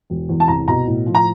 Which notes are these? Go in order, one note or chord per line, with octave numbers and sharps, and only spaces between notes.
E1
E2
A5
C2 A#5
B2 A#5
A2
F3
A#5